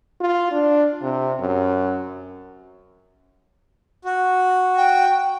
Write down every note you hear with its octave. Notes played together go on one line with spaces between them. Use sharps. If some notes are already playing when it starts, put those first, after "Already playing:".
F4
D4
C3
F#2
F#4
G5